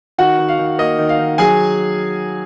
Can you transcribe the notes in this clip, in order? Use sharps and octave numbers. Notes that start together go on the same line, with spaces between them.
D#3 F#4 F#5
D#3
F5
D#3
A#3 D#5
D#3
F5
D#3
F#3 G#4 G#5